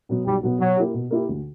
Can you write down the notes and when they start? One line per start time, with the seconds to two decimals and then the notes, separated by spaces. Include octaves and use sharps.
0.09 B2 F#3 B3
0.26 B1 G3
0.43 B2 F#3 B3
0.60 B2 F#3
0.76 A#3 E4 G4
0.94 B2
1.11 A#3 E4 G4
1.29 D2